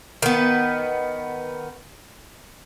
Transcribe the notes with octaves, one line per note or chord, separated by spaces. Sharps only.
D#3 B3